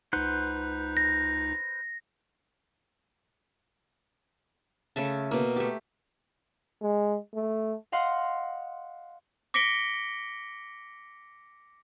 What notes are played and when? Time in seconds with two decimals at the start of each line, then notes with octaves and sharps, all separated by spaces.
0.13 C#2 D#4 B4 C5 F#5
0.97 A#6
4.96 C#3 A3 E5 A5
5.31 B2 A#3
5.56 A3 G4
6.82 G#3
7.34 A3
7.92 D#5 F5 F#5 C6
9.54 D6 A#6 B6 C#7 D7 G7